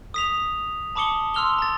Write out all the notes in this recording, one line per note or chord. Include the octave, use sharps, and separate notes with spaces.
D#6 B6 F7
A5 B5 D6 D#6 C#7 G7
C6 E6 F6 F7 G7
A#5 A6